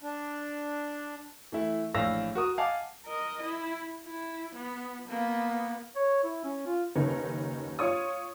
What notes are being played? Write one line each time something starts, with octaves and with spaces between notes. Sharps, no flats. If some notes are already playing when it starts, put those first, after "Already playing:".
D4
E3 A3 E4
A#1 A2 E3 F5 E6 A#6
F#4 A#4 D#6
D#5 F5 F#5 G#5 A5 D6
A#4 D#5
E4
E4
B3
A#3 B3
C#5
E4
C#4
F4
F#1 D#2 C#4 D#4 A#4 B4
F4 C#5 C#6 D#6